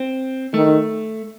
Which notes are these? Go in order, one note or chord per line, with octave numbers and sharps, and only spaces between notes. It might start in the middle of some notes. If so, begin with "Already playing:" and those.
Already playing: C4
D#3 A3